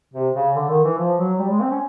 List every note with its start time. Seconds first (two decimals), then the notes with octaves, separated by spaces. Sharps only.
0.14 C3
0.35 C#3
0.56 D3
0.70 D#3
0.84 E3
0.98 F3
1.18 F#3
1.39 G3
1.50 G#3
1.60 C4
1.71 C#4